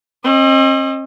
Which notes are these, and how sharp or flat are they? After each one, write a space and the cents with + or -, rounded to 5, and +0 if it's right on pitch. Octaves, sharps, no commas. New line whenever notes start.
C4 +45 D#5 +0